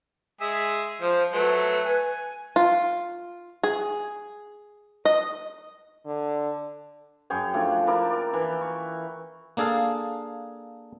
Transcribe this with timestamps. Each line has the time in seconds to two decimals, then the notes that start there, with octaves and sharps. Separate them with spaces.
0.41 G#3 G#4 E5
1.02 F3 C5
1.33 F#3 A3 B4
1.85 G#5
2.56 F4
3.63 G#4
5.05 D#5
6.06 D3
7.30 F#2 G#4 C#5 G5
7.54 F3 A3 D4
7.87 D4 E4 A#4 D5
8.13 A#4
8.33 E3
8.61 C#6
9.57 A#3 D4 G#4 A4 F5